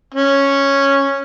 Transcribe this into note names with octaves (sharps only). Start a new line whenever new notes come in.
C#4